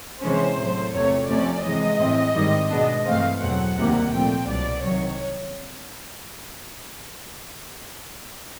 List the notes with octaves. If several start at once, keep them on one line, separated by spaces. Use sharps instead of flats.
C3 E3 G#3 C#4 C5
A2 F#3 A3
E2 C3 F3 A3 C#5
C3 F3 A3 C#4 D5
C3 E3 G#3 D#5
A2 E3 G#3 C4
G#2 D#3 G3 C4
B2 G#3 B3 D4
G2 E3 A3 C4 F5
E2 B2 F#3 A3 C4 F#5
D2 C3 D#3 G3 A#3
A#2 F3 A3 C4 G5
C2 B2 F#3 D5
C2 C3 D#3 F#3 C#5